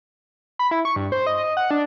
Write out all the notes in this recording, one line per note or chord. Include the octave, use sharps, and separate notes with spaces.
B5
E4
C#6
G2
C5
D#5
D#5
F#5
D4